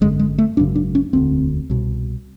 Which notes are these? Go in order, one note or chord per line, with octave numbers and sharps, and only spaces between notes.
G#1 F#2 D3 G#3
G#3
A3
G#1 F#2 C#3 D4
D4
C#4
E1 D2 D3 C4
C2 B2